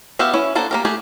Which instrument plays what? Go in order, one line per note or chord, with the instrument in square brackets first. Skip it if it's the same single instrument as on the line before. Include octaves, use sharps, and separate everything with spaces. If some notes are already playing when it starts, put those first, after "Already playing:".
[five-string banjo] B3 F#4 G4 E5 F5
C#4 E4
A#3 D4 A4 C5 F#5
A#3 G4 A#4
A3 G4 G#4 F#5